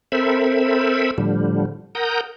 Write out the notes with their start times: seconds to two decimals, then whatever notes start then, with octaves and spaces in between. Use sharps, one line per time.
0.12 C4 A4 A#4 C5 E5 B5
1.18 A2 D3 F3 G3
1.95 A#4 F#5 A#5 D#6 G6